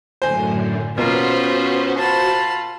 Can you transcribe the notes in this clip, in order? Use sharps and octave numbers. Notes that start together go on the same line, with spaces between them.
F#2 A2 D3 C5 G#5
B2 A#3 B3 C#4 F4 F#4 A#4 C5
F4 A5 B5